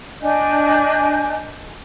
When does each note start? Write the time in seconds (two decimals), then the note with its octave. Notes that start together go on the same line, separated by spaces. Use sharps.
0.21 D4 D#5 G#5 G6